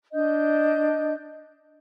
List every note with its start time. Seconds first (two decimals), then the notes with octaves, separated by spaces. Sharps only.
0.13 D4 D#5 G6